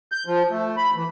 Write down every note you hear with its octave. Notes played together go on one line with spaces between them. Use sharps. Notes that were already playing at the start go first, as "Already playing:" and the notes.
G6
F3
A3
B5
E3